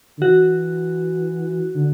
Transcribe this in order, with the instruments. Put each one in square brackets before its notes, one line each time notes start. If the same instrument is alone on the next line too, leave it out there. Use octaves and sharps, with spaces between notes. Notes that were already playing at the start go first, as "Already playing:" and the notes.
[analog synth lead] D3
[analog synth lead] E3 [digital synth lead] F#4
[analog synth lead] D3